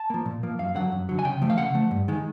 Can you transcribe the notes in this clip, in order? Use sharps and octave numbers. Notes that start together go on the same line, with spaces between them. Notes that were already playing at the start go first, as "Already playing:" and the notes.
Already playing: A5
F3 A#3
A#2
F3 A#3
F#2 F5
D3 F#3 F#5
F#2
D3 F#3
G#5
C#3 G5
F3 A3
F5
C#3 F#5
F3 A3
G2
D#3 G#3